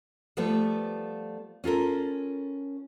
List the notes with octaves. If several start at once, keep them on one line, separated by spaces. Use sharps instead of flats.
F3 G3 A3 B3 B4
C#4 F4 A4 A#4